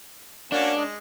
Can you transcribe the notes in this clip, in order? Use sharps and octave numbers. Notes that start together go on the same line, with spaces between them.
A#3 C#4 D4 F#4
G#3